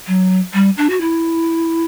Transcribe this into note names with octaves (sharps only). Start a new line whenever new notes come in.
F#3
G3
D4
F#4
E4